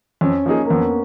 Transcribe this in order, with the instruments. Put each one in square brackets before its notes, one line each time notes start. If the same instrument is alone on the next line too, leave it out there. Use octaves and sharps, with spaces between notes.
[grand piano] F2 [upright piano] C#4
[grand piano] F3 A#3 D#4 G#4
[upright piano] A#3
[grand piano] F2 [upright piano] B3